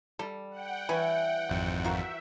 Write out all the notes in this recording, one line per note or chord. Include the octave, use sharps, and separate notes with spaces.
G3 A4
F#5 G5
E3 C#4 B4 G#5
G#1 F2
F4 F#4 A#4 E5